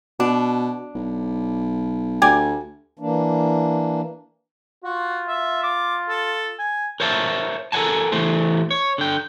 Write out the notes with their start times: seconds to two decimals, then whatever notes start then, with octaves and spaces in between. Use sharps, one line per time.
0.20 B2 D4
0.95 B1
2.22 D2 G4 D5 G#5
2.99 E3 A#3 D4
4.84 F4 F#4
5.28 E5
5.63 D6
6.09 A4
6.59 G#5
7.00 A#4 C5 C#5 E5 F5 A5
7.72 A4 A#4 D5 F#5 G#5 A5
8.12 E3 A3 C5
8.71 C#5
8.98 D3 G5